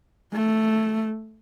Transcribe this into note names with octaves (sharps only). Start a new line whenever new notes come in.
A3